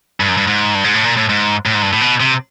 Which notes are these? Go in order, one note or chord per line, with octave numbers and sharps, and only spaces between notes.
G2
F#2
G2
G#2
G2
G#2
A2
A#2
A2
G#2
A2
G#2
G2
A2
B2
C3